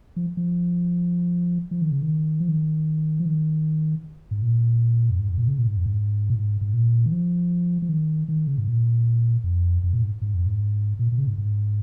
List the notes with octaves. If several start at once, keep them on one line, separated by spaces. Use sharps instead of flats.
F3
F3
F3
D#3
C#3
D#3
F3
D#3
F3
D#3
G#2
A#2
F2
G#2
F2
A#2
C#3
A#2
G#2
F2
G#2
A#2
G#2
G#2
A#2
D#3
F3
F3
D#3
D#3
C#3
G#2
A#2
F2
F2
A#2
G#2
G#2
F2
G#2
A#2
A#2
C#3
G#2
G#2